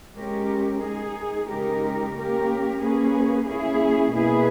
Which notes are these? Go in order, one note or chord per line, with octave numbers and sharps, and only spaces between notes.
G#3 C#4 G4 A#4
G#3 D#4 G#4
C#3 G#3 D#4 G4 A#4
A#3 C#4 G4 A#4
A#3 C#4 G#4 B4
A#3 C#4 E4 G#4
B2 A#3 E4 G#4 B4